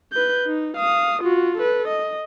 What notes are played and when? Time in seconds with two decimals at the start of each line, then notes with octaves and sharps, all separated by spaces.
0.13 B4 G6
0.46 D#4
0.77 F5 D#6
1.22 F4 F#4
1.58 A4 B4
1.88 D#5